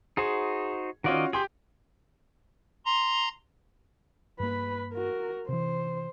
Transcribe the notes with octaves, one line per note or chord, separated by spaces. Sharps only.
D#4 F#4 G#4 C5
D#3 C#4 F4 F#4 D5 D#5
G4 G#4 G5 C6
A#5 C6
G2 A#3 B4 B5
F#4 A#4
C3 E3 C5